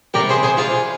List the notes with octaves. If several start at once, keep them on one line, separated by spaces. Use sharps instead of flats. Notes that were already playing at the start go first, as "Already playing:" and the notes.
C3 G3 G4 A#4
G#4 C5
G#4 C5
F4 G#4